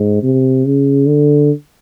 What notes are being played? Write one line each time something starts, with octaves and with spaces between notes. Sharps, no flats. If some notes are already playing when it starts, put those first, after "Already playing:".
Already playing: G#2
C3
C#3
D3